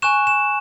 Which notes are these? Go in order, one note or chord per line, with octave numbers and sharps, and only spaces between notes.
G#5 C#6 F#6 E7
E7